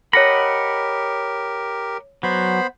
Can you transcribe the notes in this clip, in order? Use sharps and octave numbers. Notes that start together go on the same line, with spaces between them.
G4 A#4 C#5 D#5 F#5 B5 A#6
F#3 B3 C5 B5